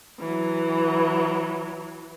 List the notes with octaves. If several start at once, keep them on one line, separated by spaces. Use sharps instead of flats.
E3 F#3